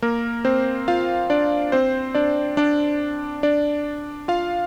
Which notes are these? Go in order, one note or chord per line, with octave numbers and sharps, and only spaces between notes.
A#3 A#4
C4 C5
F4 F5
D4 D5
C4 C5
D4 D5
D4 D5
D4 D5
F4 F5